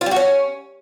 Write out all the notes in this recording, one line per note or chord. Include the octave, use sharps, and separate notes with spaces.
F4
G3
F#4
C#4